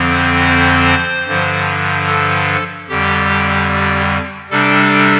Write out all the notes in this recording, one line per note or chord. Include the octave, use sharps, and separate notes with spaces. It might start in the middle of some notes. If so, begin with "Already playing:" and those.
Already playing: F2 D3 F3 C4
C5
G2 D3 F3
A4
F2 D3 G3 G4
C3 G3 D4 A4